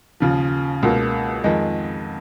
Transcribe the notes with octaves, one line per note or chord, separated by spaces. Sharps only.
D#2 C#3 F3
C#2 B2 A#3
F2 D#3 G#3 D#4